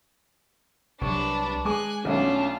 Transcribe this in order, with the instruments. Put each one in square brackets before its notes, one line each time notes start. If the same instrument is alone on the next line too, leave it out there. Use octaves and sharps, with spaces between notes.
[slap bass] C2 C3 F#3 [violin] D4 B4 [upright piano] C#6
[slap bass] G#3 [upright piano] G#4 D6 [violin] G#5 F#6
[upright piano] B1 A3 F#5 [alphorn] C#4 [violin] D4 F4